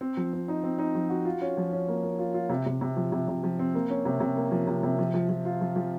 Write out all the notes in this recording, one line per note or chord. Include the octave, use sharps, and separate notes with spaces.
C4
F3
C4
D#4
C4
D#4
F3
F#4
F4
C#4
F3
C#4
A#3
A#3
F4
F4
C3
C3
C3
F3
C3
C3
F3
C4
A#3
C#4
C3
C3
A#3
F3
C3
C3
F3
F3
F3
F4
F3
F3